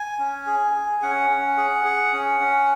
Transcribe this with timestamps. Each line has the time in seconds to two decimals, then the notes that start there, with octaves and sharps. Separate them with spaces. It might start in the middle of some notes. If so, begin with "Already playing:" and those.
Already playing: G#5
0.19 C#4
0.47 G#4
0.75 G#4
1.02 C#4 F#5
1.30 C#4
1.57 G#4
1.85 G#4
2.13 C#4
2.40 C#4